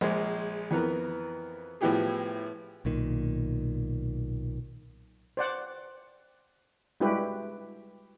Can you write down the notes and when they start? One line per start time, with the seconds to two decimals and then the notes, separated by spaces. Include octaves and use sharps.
0.01 A#1 G#3 C5
0.71 F2 E3 B3 A#4 B4
1.81 A2 F3 B3 E4 G4 G#4
2.85 B1 A#2 D#3
5.37 C5 D5 F#5
7.00 G3 G#3 E4 F#4 G4 B4